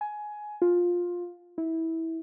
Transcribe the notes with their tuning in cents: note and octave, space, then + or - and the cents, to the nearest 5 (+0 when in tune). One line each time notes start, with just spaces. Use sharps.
G#5 +15
F4 +10
E4 -20